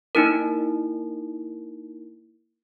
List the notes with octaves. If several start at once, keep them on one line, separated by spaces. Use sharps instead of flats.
A#3 D#4 E4 A#4